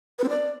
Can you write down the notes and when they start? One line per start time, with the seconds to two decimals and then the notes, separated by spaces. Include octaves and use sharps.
0.19 B4
0.24 C4
0.29 D5